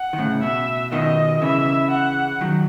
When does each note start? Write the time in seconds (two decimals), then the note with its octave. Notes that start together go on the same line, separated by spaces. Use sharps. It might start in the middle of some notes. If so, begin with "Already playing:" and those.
Already playing: F#5
0.13 D#3
0.18 A2 C#3
0.43 B2 E5
0.92 B2 D#3 D#5
1.42 C#3 E3 E5
1.91 F#5
2.41 D#3 F#3